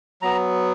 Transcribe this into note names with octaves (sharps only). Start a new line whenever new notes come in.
F#3 B3 A#5